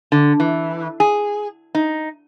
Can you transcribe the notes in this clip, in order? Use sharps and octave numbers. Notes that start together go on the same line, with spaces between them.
D3
E3
G#4
D#4